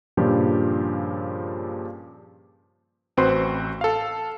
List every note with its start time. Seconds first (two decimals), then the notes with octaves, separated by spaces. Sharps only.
0.17 G2 A#2 C#3 F3 G4
3.17 A1 C4 F#4 B4 C5 C6
3.81 A4 F5